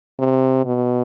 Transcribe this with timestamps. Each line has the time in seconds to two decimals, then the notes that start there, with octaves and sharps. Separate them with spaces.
0.19 C3
0.65 B2